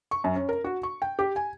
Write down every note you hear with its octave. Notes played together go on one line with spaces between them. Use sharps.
C#6
F#2
C#4
A#4
F#4
C#6
G5
G4
G#5